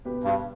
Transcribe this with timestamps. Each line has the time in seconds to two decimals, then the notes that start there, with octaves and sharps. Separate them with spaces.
0.05 B2 B3 G4 B4
0.24 G2